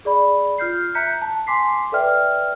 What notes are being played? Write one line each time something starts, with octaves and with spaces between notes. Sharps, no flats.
G#4 D5 B5
F4 F6 G6 C7
E5 A#5 F#6 G6 B6 C#7
A5
G#5 C6 D6 B6 C7
A4 B4 D5 E5 G5 F6